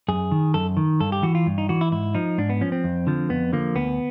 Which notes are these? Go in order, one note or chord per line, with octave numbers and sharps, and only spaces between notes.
F#2 G#4
D#3
F#2 A4
D#3
G2 A4
G4
E3 F#4
F4
G2
D#4
E3 F#4
E4
G#2 E4
F3 D#4
G#2 D4
B3
F3 C#4
C4
F2
D3 F3
F2 B3
D3 F3 A#3
D2 B3